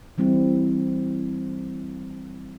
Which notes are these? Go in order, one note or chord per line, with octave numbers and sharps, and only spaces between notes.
E3 G3 C4 E4